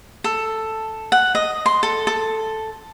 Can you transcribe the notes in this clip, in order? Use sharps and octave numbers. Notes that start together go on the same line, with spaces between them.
A4
F#5
D#5
C6
A4
A4